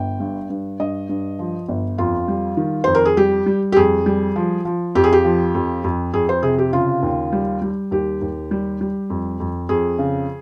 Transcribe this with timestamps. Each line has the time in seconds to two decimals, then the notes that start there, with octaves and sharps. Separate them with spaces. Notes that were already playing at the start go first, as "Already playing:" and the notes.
Already playing: G1 G5
0.20 G2
0.50 G2
0.80 G2 D#5
1.09 G2
1.39 F3
1.69 G1
1.98 F2 F4
2.28 G3
2.57 D#3
2.84 F2 C5
2.95 A#4
3.05 G#4
3.17 G3 G4
3.46 G3
3.72 G4
3.76 F2 G#4
4.06 G3
4.36 F3
4.65 F3
4.95 F2 G4
5.04 G#4
5.13 G4
5.25 F3
5.55 F2
5.84 F2
6.13 F2 G#4
6.29 C5
6.43 C3 G#4
6.58 G4
6.73 C#3 F4
7.02 D#2
7.33 G3
7.62 G3
7.91 D#2 G4
8.21 D#2
8.51 G3
8.81 G3
9.10 F2
9.40 F2
9.69 F2 G#4
9.99 C#3